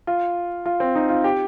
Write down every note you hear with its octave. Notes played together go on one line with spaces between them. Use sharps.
F4
F4
C4
D#4
F4
G4